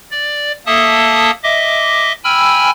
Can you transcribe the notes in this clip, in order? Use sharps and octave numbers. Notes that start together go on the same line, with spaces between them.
D5
A#3 A4 E5 A5 D#6
D#5 E5 D6
G5 G#5 B5 E6 F6